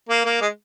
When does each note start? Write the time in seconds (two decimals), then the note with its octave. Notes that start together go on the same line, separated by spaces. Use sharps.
0.09 A#3
0.25 A#3
0.41 G#3